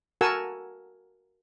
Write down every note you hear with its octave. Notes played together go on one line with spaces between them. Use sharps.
F#4 A4 A#4 F#5 G#5 E6